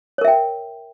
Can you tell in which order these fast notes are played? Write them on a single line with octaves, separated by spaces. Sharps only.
C#5 A#4 E5 G5